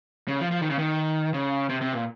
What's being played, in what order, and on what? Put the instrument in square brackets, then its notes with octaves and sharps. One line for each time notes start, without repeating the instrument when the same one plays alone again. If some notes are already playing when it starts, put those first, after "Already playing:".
[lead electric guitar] C#3
F3
F3
D#3
C#3
D#3
C#3
C3
C3
A#2